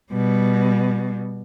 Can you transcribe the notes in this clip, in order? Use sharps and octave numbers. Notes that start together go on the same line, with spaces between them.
B2 G3